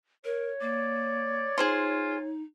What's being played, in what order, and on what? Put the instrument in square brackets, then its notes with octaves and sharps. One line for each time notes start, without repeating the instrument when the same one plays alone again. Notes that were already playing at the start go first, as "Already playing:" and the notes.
[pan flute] A#4 [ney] C#5
[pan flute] A#3 [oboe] D5
[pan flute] D#4 [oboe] F4 [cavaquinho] G#4 C5 C6